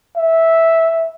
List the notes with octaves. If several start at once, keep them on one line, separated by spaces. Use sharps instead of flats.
E5